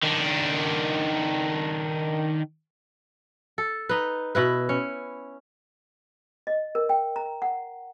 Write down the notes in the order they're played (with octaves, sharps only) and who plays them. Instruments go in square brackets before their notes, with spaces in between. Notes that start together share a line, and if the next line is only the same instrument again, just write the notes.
[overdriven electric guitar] D#3 D4
[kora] A4
D#4 B4
B2 E4 B4
C#4
[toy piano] D#5
A#4
G5
A#5
F#5